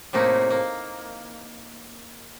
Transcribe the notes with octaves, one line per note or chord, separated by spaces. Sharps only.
A2 C3 A3 A#3 D#4
A#3